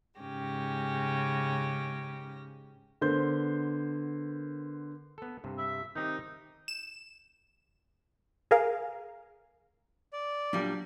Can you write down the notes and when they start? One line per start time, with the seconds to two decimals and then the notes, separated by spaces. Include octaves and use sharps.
0.19 G#2 C#3 C#4 G4 A#6
3.01 D3 B3 A#4 C5 C6 G6
5.18 B3 A4
5.44 G2 C3
5.58 E5
5.96 D#3 C4 D#4 G4
6.68 E7
8.51 G#4 A#4 F5
10.13 D5
10.53 A#2 F#3 G3 D4